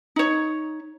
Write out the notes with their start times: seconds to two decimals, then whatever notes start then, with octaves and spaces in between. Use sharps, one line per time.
0.16 D#4 C#5